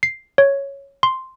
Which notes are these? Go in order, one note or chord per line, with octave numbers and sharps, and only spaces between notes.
C7
C#5
C6